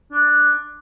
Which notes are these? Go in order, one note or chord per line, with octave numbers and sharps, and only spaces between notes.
D4